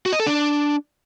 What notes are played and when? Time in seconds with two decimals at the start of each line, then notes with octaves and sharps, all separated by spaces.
0.06 F#4
0.13 D#5
0.20 A4
0.27 D4